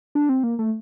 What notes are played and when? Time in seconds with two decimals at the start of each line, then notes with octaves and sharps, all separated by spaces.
0.15 D4
0.29 C4
0.43 A#3
0.59 A3